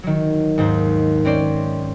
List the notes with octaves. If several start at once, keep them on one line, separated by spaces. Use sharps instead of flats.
D#3 F#3
D#2 G#2 C5
C4 C#4 C5 D5